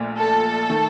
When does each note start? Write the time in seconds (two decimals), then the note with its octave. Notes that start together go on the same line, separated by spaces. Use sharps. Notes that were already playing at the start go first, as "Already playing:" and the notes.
Already playing: A#1 A#2 A3
0.17 A4
0.70 D#3 A3